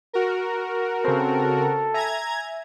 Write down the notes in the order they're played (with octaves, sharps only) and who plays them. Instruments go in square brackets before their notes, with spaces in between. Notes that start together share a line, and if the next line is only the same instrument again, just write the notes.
[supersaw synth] F#4 A#4
[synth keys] C#3 C4 [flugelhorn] A4
[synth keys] E5 G#5 [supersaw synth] A#5 G#6